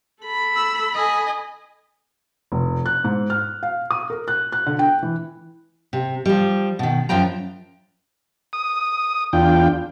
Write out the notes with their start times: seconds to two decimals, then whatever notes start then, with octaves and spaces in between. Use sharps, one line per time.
0.23 A4 B5
0.57 E6
0.94 D#5 G#5
2.52 F1
2.86 F#6
3.04 G#2
3.30 F6
3.63 F5
3.91 D#6
4.10 A#4
4.28 F#6
4.52 F#6
4.66 D3
4.79 G5
5.03 E3
5.93 C3
6.26 F3 G3
6.79 B2 D#3
7.09 F#2 F3 F4 G5 A#5
8.53 D#6
9.33 E2 D4 F4 G5